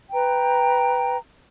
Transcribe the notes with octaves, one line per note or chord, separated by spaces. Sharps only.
B4 G5 A#5